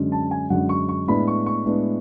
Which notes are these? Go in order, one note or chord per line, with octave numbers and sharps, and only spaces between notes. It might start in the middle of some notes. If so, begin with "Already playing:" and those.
Already playing: F#2 D3 G#3 C#4
A5
G#5
F#2 D3 G#3 C#4 F#5
C#6
C#6
A2 G#3 B3 D4 B5
C#6
C#6
A2 G#3 B3 D4